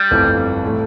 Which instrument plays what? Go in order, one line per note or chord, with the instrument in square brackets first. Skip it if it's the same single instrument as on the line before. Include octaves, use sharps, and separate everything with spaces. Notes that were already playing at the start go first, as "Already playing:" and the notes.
Already playing: [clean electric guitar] G3
[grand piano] G1 F2 E3 A3 C4
A2 E3 A3